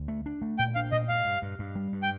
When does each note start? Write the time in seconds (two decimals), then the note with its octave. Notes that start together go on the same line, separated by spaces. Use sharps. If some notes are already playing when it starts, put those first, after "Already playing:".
Already playing: D2
0.08 A3
0.26 D4
0.42 A3
0.58 A#2 G5
0.75 D4 F5
0.92 A#2 D#5
1.09 G2 F5
1.25 G2
1.42 G2
1.59 G2
1.75 G3
1.92 G2
2.03 G5